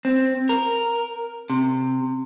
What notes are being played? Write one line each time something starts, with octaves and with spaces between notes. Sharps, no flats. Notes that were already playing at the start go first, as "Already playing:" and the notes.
C4
A#4
C3